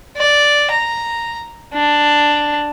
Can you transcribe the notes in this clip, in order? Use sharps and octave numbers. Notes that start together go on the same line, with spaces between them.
D5
A#5
D4